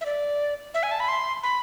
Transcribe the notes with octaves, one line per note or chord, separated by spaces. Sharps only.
E5
D5
E5
G#5
A5
B5
C6
B5